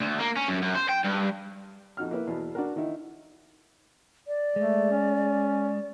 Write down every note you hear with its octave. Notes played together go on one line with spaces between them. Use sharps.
D2
A#3
C#4
F#2
F#2
C5
G5
G2
F2 D#4 F#4 F6
A#3 E4 B4
E2 B2
D4 F#4 A#4
D#3 D#4 E4
D5
G#3 A3
C#4